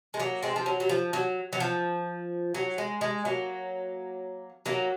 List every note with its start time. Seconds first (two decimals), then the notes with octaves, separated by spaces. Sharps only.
0.14 G#3
0.20 F#3 A#3
0.43 G#3 C4
0.56 F3
0.66 F#3
0.80 F#3
0.89 F3
1.13 F#3
1.53 F#3
1.60 F3
2.55 F#3
2.78 G#3
3.01 G#3
3.25 F#3 A#3
4.66 F#3 A#3